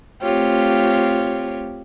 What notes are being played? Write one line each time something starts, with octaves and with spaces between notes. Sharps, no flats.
A3 C4 F4 G4 C#5